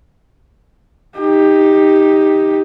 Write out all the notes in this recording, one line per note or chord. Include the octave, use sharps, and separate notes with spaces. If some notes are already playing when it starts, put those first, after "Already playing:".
D#4 G4